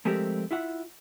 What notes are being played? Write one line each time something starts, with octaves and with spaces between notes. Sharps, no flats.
F3 G#3 A3 C4 G4 A#4
E4 F4 E5 F#5